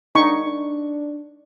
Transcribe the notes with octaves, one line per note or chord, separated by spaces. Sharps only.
D4 D#4 C#6
D4